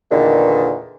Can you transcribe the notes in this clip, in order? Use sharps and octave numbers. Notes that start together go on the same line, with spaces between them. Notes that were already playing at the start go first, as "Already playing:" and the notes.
E2 A#2 D3 D#3